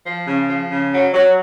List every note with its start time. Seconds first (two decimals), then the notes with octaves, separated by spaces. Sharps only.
0.06 F3
0.27 C#3
0.49 F3
0.71 C#3
0.92 F#3
1.14 F#3